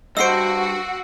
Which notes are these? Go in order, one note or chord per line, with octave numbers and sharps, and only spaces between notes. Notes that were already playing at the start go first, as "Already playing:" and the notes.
G2 F#4 C5 D#5 E6 C7 D7